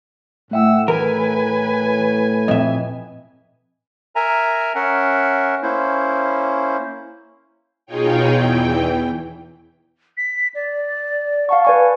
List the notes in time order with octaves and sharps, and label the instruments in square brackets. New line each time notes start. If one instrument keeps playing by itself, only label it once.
[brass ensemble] A2 [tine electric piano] A3 E5 G5 [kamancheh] F#5 E6
[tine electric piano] E3 [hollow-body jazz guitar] A#4 [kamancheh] B4 G#5
[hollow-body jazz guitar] F2 E5 [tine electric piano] A#2 C4 D#5
[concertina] A#4 E5 G#5 A#5
C#4 A#4 E5 F#5
A#3 C#4 E4 C5
[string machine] B2 D#4 F4 G#4 C#5 G5
E2 E3 G5
[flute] B6
D5
[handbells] F5 A5 C#6 [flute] F#5
[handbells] B4 D5 C#6 [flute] G#5